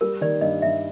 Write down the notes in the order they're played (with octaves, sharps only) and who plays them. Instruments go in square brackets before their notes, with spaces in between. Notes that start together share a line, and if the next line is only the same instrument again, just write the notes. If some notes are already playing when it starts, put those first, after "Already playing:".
[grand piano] G3 [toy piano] A#4
[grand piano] D#3 [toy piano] D5
[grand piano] G2 [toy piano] D#5
[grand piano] G2 [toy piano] E5